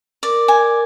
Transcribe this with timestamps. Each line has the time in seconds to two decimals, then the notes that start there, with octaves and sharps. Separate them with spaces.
0.23 A#4 D5
0.48 G#5